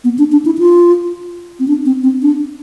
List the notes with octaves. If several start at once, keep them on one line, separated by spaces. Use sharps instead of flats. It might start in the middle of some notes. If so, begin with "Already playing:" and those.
B3
D4
D4
E4
F4
C4
D4
C4
C4
D4